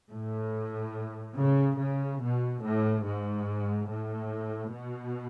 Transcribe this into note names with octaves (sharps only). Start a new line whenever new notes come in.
A2
C#3
C#3
B2
A2
G#2
A2
B2